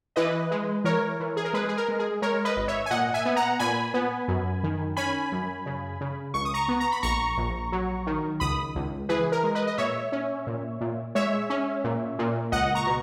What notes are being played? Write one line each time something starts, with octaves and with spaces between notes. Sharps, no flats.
E3 B4 D#5
G#3
E3 A#4 C#5
E3
G#4
A#4
G#3 G#4 B4
G#4
A#4
G#3
G#4
G#3 A#4 C#5
B4 D#5
G#1
C#5 E5
G#5
A#2 D#5 F#5
E5 G#5
B3
F#5 A#5
A#2 G#5 B5
B3
F#2
D#3
C#4 G#5 B5
F#2
C#3
C#3
C#2 C#6
D#6
A#5 C#6
B3
A#5
B5
A#1 A#5 C#6
A#1
F#3
D#3
C#2 B5 D#6
C#2
E3 G#4 B4
A#4
G#3
B4 D#5
D#5
A#2 C#5 E5
C#4
A#2
A#2
G#3 C#5 E5
C#4
A#2
A#2
C#2 D#5 F#5
A#5 C#6
B2